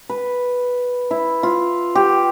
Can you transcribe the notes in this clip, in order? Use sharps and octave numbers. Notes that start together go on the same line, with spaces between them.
B4
E4
F4
G4